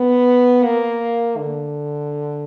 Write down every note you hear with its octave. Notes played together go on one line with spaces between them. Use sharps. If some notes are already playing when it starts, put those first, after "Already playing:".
Already playing: B3
A#3
D3